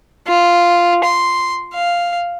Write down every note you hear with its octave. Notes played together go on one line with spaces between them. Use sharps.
F4
C6
F5